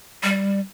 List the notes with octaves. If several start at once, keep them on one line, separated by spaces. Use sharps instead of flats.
G3